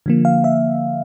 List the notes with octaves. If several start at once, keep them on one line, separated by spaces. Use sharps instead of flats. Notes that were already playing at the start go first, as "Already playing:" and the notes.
D3 F3 A#3
F5
E5